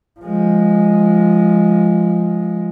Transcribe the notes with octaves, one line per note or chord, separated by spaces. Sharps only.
F3 G#3